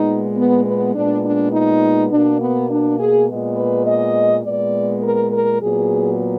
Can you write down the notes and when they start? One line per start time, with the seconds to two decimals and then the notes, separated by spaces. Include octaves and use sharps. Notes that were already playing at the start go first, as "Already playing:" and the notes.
Already playing: A#2 G#3 B3 D#4
0.36 B3
0.65 B3
0.95 A#2 G#3 B3 D4
1.24 D4
1.53 D#4
2.11 B2 A#3 D4
2.40 B3
2.70 D4
2.99 G#4
3.28 A#2 G#3 B3
3.57 B4
3.86 D#5
4.44 A#2 G#3 B3 D5
5.03 A#4
5.32 A#4
5.61 A#2 F#3 B3 G#4